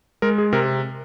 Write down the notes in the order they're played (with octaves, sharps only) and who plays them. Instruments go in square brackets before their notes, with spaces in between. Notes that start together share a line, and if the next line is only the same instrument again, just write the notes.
[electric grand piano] G#3 A#4
G#4
C3 A#4